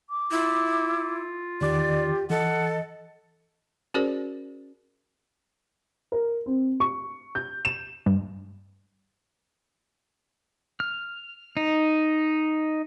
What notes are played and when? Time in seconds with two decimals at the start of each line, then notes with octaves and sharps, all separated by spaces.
0.10 D6
0.31 E4 F4
1.61 E2 D#3 G4 D5 D6
2.30 E3 A4 D#5 F#5
3.94 C#4 F#4 G#4 A#4 C5 D5
6.12 A#4
6.46 C4
6.80 C#6
7.35 G6
7.65 E7
8.06 G2
10.80 F6
11.57 D#4